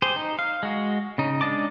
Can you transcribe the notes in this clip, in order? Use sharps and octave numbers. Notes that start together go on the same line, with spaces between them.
G4 G#4 C5
D#4
F5
G#3 F#4
C#3 D#4
G#3 D4 D#5 A5 D6